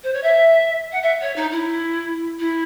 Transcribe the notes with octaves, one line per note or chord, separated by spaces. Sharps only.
C5
C#5
E5
F#5
E5
C#5
D#4
E4
E4